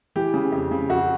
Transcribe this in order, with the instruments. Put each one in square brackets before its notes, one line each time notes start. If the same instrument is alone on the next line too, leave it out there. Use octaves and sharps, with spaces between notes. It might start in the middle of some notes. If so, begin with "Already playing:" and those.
[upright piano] E3 G4
C#3
F2
C#3
F2 F#4